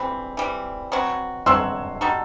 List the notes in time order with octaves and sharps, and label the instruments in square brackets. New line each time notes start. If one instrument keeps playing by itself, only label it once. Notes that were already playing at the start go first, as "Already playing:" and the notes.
Already playing: [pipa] E3 G3 C4 [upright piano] B5
[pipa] E3 G3 C4
B2 F#3 C4 F#4
[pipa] B2 F#3 C4 F#4 [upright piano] C6 E6
[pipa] G3 D#4 F#4 A4